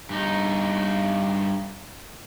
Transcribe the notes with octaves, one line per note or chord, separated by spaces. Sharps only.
G2 D#4